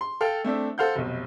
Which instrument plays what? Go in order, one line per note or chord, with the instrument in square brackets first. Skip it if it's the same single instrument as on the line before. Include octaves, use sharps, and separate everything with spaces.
[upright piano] C6
A4 F5 G5
A3 C4 D4 E5
A4 C5 F5 F#5 G6
F1 B1